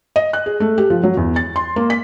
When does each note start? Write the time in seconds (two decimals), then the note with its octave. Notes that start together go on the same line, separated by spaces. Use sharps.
0.16 D#5
0.33 F#6
0.46 G#4
0.60 A3
0.78 G4
0.90 F3
1.03 F#3
1.17 E2
1.36 A6
1.56 C6
1.76 A#3
1.90 B6